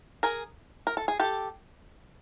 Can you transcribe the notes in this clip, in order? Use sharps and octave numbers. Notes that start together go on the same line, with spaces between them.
G#4 A#4
A#4
A4
G#4
G4 A4